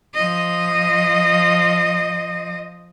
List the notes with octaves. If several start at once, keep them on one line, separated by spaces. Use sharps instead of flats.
F3 D#5